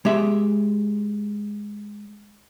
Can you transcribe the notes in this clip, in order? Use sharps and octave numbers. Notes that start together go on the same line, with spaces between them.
G#3 G4 E5